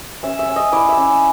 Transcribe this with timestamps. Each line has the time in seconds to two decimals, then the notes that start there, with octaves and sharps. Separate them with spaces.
0.23 C#4 E5
0.39 E5
0.48 C#4
0.56 D#5
0.72 E4 D5
0.89 E5
0.97 C#4